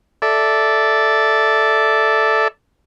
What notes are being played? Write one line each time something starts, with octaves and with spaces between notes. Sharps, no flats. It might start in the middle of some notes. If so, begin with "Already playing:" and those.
A4 D5 E5